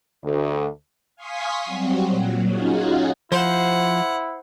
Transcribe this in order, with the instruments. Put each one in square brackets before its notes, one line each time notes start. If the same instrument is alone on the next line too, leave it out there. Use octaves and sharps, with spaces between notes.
[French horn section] D2
[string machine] F5 G#5 C6 C#6 D#6 B6
F#3 G3 C4 F#4
A#2 F#3
C#4 D#4 F4 F#4 G#4
[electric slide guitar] F3 [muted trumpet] E4 [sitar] C5 [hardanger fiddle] F#5